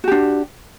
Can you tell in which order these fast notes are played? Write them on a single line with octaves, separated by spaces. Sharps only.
F#4 G4 D4